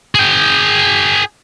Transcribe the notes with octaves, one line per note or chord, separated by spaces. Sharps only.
G#4 G5